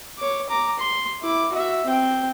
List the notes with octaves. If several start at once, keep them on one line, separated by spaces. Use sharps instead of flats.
C#5 D6
A#5 D6
C6
E4 D6
F#4 E5
C4 G5